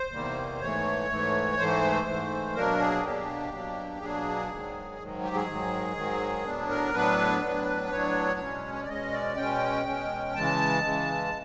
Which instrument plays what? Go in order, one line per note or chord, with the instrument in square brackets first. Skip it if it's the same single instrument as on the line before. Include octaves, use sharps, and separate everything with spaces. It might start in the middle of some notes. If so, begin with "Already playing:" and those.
Already playing: [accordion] C5
E2 C3 D#3 G3 A#3
G#2 E3 A3 C#5
G#2 E3 A3
G#2 E3 A3 C5
G#2 E3 A3
B2 F#3 A#3 D4 A#4
G#4
B2 F#3 A#3 D4 G4
B2 F#3 A#3 D4
B2 F#3 A#3 D4 G#4
G#2 D#3 F#3
G#2 D#3 F#3
G4
G#4
G#2 D#3 F#3
G#2 D#3 F#3
A2 F#3 B3 D4
A#4
A2 F#3 B3 D4 B4
A2 F#3 B3 D4
A2 F#3 B3 D4 C#5
B2 G#3 C#4
C#5
D5
B2 G#3 C#4 D#5
D5
B2 G#3 C#4 G5
B2 G#3 C#4
C#3 E3 G#3 A5
C#3 E3 G#3